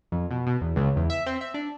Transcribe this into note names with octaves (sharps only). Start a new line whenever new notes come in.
F2
B2
B2
E2
C#2
E2
E5
C4
E5
D4